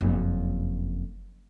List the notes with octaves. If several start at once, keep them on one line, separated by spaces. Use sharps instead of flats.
F#1 F2